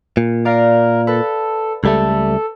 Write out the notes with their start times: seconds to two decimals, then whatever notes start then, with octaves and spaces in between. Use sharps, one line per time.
0.17 A#2
0.45 A#4 D5 F5
1.07 A4 B4
1.84 C#2 G3 A3 A4